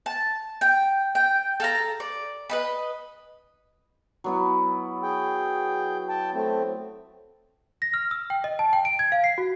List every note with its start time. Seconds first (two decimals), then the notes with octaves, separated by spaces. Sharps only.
0.06 A5
0.61 G5
1.15 G5
1.60 A4 F5 A#5
2.00 D5
2.50 B4 D#5 B5
4.24 F#3 B3 E4
5.03 G#4 G5
6.09 G5 A5
6.34 A3 C4
7.82 A#6
7.94 F6
8.11 E6
8.30 G5
8.44 D#5
8.59 A5
8.73 G5
8.85 D7
8.99 G#6
9.12 F5
9.24 C7
9.38 F#4